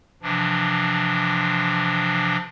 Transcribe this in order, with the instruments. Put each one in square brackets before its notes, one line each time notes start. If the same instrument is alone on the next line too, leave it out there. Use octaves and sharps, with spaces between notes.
[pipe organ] C3 E3 F3 D4